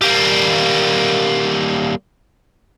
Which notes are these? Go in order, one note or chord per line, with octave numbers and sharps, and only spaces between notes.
G3 A#3